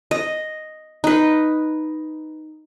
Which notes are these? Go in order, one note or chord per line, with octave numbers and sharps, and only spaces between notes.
D#5
D#4 B4